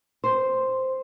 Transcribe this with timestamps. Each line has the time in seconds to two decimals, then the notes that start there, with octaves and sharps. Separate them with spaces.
0.24 C5